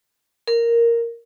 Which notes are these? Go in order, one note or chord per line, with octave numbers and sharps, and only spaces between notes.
A#4